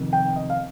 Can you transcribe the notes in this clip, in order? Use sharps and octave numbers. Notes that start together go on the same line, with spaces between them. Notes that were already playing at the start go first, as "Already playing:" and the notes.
Already playing: F1 F2 D#3
G5
D#5
F5